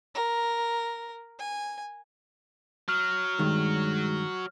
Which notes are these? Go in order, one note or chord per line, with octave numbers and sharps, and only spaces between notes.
A#4
G#5
F#3 F6
G2 D#3 G#3